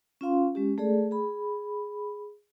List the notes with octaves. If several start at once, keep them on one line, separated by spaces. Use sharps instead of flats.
C#4 F4 F5 C6
G#3 C#4 G4
A3 G#4 A4 D5
G#4 B5